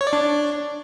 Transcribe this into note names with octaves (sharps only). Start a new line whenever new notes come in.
C#5
D5
D4